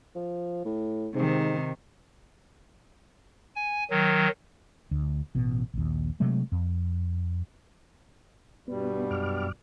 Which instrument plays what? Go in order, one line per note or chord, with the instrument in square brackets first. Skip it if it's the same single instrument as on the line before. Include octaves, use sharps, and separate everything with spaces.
[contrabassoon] F3
A2
[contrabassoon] G#2 [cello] C3 D#3
[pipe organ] G#5
D#3 F#3
[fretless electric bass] D2
A1 B2
A#1 D#2
C3 F#3 G#3 A3
F2
[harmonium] G2 B2 G3 [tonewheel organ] B3
[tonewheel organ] F#2 D6 F6